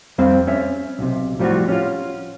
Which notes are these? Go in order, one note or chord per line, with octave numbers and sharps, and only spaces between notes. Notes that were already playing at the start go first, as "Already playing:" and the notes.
F2 G3 C4 F5
C#4 E5
B1 C3
A2 F3 G3 D#4 F4 F#4
C#4 F4